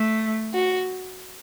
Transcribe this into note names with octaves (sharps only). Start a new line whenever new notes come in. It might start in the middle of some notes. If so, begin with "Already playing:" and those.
Already playing: A3
F#4